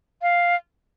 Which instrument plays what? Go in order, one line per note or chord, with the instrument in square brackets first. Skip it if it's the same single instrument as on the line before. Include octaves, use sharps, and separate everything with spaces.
[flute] F5